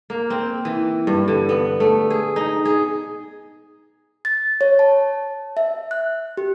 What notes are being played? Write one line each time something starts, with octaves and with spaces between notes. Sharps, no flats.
A#3
C4
E3
G2
D3
B3
A3
G#4
D#4
G#4
A6
C#5
A5
E5
F#6
G4